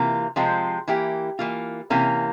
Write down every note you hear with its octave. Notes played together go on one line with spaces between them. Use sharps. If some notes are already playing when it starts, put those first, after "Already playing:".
Already playing: C3 E3 A#3 F4
C3 F3 G#3 C4 F4
E3 A#3 E4 G4
E3 A#3 F4
C3 E3 A#3 C#4